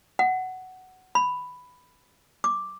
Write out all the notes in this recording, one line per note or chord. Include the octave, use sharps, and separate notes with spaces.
F#5
B5
D6